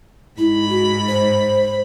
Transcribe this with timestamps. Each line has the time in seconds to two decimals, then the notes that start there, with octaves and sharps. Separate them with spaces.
0.38 G#2 E4 B5
0.69 F#4
1.08 C5